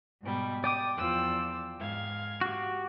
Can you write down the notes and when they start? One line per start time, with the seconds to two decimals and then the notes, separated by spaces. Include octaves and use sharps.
0.22 G#2 B2 G3
0.64 D5 G5 D6 D#6
0.96 E2 F3 E6
1.77 G#2 F5 G#6
2.41 F#4 G4